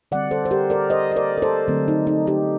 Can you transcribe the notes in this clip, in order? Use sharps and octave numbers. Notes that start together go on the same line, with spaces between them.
D3 G3 C4 D5 F#5
A4 C5
C5
G4 A#4
A#4 D5
C5 D#5
D#5
A#4 D5
A#4
A4 C5
D3 F#3 A3 C4
D#4
D#4
D#4 G4